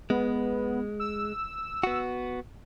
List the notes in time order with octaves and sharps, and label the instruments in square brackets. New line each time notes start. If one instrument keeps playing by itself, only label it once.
[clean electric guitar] G#3 [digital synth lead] B3
[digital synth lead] E6
[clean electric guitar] B3 F#4